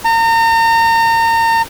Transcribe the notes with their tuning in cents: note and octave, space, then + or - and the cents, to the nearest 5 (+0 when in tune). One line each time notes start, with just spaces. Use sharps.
A#5 -35